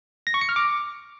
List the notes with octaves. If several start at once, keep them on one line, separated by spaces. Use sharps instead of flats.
A#6
C#6
C#7
F6
D6